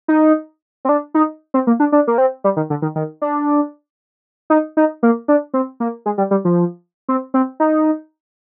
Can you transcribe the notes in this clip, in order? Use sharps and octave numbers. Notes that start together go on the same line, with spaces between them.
D#4
C4
D4
D#4
C4
A#3
D4
D4
A#3
C4
G3
D#3
D3
D#3
D#3
D4
D#4
D#4
A#3
D4
C4
A#3
G#3
G3
G3
F3
C4
C4
D#4